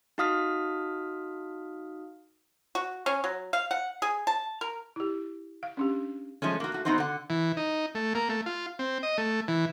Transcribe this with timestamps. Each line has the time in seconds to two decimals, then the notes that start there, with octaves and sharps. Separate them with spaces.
0.18 D#4 F#4 F5 D#6 F6 B6
2.75 F#4
3.06 C#4
3.24 F#3
3.53 F5
3.71 F#5
4.02 G#4
4.27 A5
4.61 A#4
4.96 E4 G4
5.63 F5
5.77 C#4 D4 G4
6.42 F3 G#3 A3 C#4
6.60 A#3 F#4
6.72 A3 F#4
6.85 B3 C4 D#4 F#4 C5
6.98 D3 F#5
7.30 E3
7.57 D#4
7.95 A3
8.15 A#3
8.29 A3
8.46 F4
8.79 C4
9.03 D#5
9.18 A3
9.48 E3